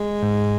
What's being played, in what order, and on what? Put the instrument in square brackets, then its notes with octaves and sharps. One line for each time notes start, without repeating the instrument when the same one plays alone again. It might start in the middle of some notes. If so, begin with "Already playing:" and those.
Already playing: [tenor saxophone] G#3
[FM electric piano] G#2